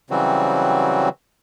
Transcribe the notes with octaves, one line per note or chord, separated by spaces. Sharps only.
C#3 E3 F#3 G3 C4 F#4